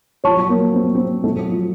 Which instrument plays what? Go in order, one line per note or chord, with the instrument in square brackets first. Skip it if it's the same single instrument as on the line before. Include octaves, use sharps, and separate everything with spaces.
[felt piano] F3 [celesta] C#5 A5 C#6
[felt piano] F#3
A#3
C4
A#3
C4
A3
F#3
F3